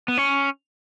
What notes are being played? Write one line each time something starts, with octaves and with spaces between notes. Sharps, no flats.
B3
C#4